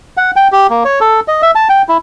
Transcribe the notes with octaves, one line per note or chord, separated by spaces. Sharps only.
F#5
G5
G4
A#3
C#5
A4
D#5
E5
A5
G5
E4